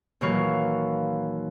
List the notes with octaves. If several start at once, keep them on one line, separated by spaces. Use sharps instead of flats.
D#2 A#2 E3 F#3 C#5 F5